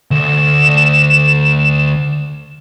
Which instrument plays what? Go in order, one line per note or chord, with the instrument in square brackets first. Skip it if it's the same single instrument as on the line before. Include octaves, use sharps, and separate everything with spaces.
[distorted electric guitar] D2 [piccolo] E7